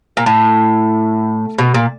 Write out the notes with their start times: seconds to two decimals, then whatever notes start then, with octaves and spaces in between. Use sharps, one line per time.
0.17 A#2
0.26 A2
1.58 B2
1.74 A#2